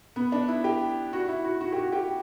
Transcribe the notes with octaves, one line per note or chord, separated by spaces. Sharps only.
B3
D4
E4
G4
F#4
E4
F#4
F#4
G4
F#4
G4